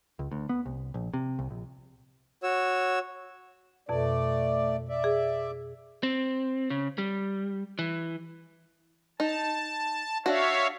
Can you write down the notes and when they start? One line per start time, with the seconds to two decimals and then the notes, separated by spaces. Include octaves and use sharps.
0.19 C#2
0.32 D2
0.49 B3
0.66 C2
0.94 A#1
1.14 C3
1.39 C2
1.51 A#1
2.43 F#4 C#5 E6
3.89 F2 B2 A3 D5
4.89 D5 E5
5.04 G#4
6.03 C4
6.70 C#3
6.98 G3
7.79 E3
9.20 D#4 A5
10.26 D4 F#4 C#5 E5 F5